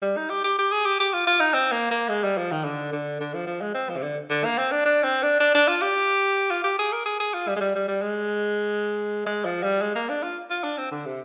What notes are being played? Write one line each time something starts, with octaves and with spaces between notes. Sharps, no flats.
G3
D#4
G4
G4
G4
G#4
G4
G4
F4
F4
D#4
C4
A#3
A#3
G#3
G3
F3
D#3
D3
D3
D3
F3
F3
G#3
C4
F3
C3
D3
D3
A#3
C4
D4
D4
C4
D4
D4
D4
F4
G4
F4
G4
G#4
A#4
G#4
G#4
F4
G3
G#3
G3
G3
G3
G#3
G#3
F3
G3
G#3
A#3
D4
F4
F4
D4
C4
D3
C3